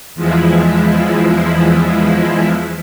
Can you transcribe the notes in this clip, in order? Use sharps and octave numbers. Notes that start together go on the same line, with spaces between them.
E2 F3 G#3 E4